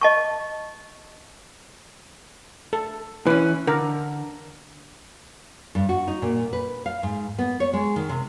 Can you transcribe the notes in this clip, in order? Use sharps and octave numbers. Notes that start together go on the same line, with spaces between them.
D#5 A5 C#6
A4
E3 C#4 B4
D3 A#4
G2
F#4
D#4
A#2
B4
F5
G#2
B3
C#5
G#3
D#3
C3